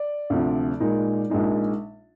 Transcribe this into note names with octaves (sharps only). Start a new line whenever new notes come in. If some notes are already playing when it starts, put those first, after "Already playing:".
Already playing: D5
D2 C3 F3
A#2 G#3 D#4
A#1 A#2 G#3 D#4